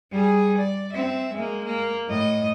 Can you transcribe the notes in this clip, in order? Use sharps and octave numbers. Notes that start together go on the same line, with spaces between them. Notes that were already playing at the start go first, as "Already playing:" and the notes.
G3 G#4
D5
C4 E5
G#3 A#3
A#3
A2 D#5